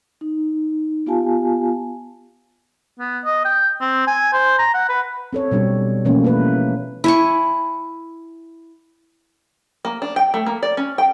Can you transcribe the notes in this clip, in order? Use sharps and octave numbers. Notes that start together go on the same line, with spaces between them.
D#4
B3 F4 G4 F5 G#5 A5
B3
D#5
G5
C4
G#5
C5
A#5
F#5
B4
C4 A4 C#5
B2 G3 D4 G4
B2 E3 F3 A3 A#3 C#4
A3 A#3 B4
E4 G#5 C#6
A#3
D4
G5
A3
A#3
D5
C#4
G5